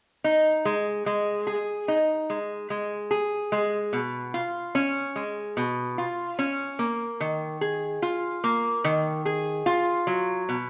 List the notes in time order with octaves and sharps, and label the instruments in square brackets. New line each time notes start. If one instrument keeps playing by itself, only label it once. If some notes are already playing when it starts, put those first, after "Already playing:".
[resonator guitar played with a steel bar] D#4
G#3
G#3
G#4
D#4
G#3
G#3
G#4
G#3
B2
F4
C#4
G#3
B2
F4
C#4
A#3
D#3
G#4
F4
A#3
D#3
G#4
F4
F#3
B2